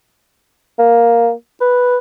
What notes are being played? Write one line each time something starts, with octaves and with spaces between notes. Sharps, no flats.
A#3
B4